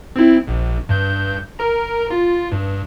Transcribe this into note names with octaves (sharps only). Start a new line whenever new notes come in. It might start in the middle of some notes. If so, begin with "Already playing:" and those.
C4 E4
A#1
G2 G6
A#4 A#5
F4
G2